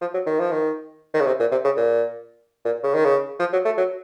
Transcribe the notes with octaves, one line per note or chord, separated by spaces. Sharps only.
F3
F#3
D#3
F3
D#3
D#3
C#3
C3
A#2
C3
C#3
A#2
A#2
C#3
D#3
C#3
F3
F#3
A3
F#3